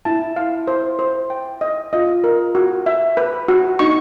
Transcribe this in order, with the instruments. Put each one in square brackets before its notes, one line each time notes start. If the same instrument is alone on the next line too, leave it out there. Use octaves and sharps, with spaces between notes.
[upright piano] E4 [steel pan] A5
[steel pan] F5
C5
C5
G5
D#5
[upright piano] F4 [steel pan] D#5
[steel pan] A#4
F#4
E5
B4
F#4
[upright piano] D#4 [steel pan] C#6